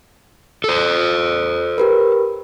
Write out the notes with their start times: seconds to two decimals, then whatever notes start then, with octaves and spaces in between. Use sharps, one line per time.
0.64 A4 C5
1.78 G4 A#4 B4